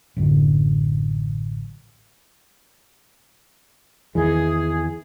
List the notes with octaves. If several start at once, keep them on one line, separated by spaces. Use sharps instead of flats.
A1 F#2 D3
E2 D#3 E3 G#4